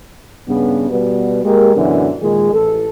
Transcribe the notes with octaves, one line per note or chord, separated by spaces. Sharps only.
G2 C#3 B3
B2 G3 B3
G#3 A#3 G4 A#4
F#2 B2 D3 E3
A#2 D#3 G#3
A1 A4